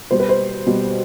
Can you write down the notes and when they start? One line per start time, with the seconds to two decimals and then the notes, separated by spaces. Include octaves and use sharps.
0.11 B2 G3 C5
0.20 B4
0.29 C5
0.66 B2 G3